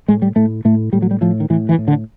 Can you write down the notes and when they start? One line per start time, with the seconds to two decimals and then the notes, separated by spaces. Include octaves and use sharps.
0.08 A2 G#3
0.22 G3
0.36 A2 A3
0.65 A2 A3
0.93 A2 G3
1.02 F#3
1.11 G3
1.21 A2 F3
1.40 D#3
1.50 A2 E3
1.69 E3
1.78 A2
1.88 D3